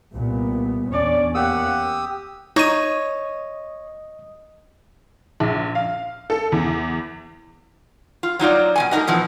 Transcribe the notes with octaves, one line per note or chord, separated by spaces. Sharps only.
C2 A#2 B3
E2 C#4 D4 C#5 D5
A#3 G4 F#5 D#6 E6
D#4 C#5 D#5 C#6 D#6 D#7
A#1
F5
A4
E2
F4
F#3 D#4 F4 D5
B2 G#3 G#5
A3 A#3 C4 D#4 F#4
B2 E3 F3